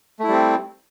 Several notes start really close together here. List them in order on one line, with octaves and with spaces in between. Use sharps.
A3 E4 G3 C4